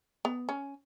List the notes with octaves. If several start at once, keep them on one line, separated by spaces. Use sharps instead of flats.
B3
C#4